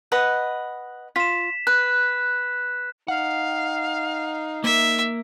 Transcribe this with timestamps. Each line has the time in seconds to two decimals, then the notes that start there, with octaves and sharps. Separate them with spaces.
0.12 B4 D#5 F#5
1.16 F4 B6 E7
1.67 B4 F#6
3.08 D#4 F5 F#5
4.64 A#3 A#4 E5